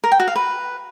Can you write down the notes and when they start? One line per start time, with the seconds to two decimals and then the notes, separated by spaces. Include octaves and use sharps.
0.04 A#4
0.12 G5
0.20 F#4
0.28 F5
0.36 B4